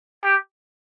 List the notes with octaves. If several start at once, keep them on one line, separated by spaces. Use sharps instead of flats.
G4